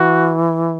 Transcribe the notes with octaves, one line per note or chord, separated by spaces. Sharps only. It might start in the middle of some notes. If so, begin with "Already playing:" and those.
Already playing: E3 F#4